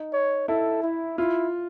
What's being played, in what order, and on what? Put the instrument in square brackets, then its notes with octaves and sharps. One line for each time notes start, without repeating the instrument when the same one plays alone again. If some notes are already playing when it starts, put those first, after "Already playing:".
Already playing: [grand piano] D#4
[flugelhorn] C#5
[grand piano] E4 [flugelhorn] A4
[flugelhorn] E4
[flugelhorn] E4 [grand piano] F4